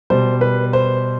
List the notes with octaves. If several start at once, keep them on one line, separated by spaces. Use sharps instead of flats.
B2 G3 C5
B4
C5